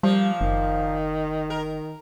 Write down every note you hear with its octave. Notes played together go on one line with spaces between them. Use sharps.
A#2 F3 G3
F#1 D#3
A#4